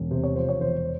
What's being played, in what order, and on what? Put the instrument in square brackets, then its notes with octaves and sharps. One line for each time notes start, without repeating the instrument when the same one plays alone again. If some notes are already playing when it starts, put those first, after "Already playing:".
Already playing: [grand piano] E1
C3 C5
C#5
F3 C5
C#5
E1 C5